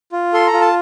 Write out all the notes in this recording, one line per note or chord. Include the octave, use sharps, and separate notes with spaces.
F4
A4 C6
A#5
F4
A5